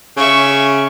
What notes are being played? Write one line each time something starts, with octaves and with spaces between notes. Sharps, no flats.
C#3 E5 C#6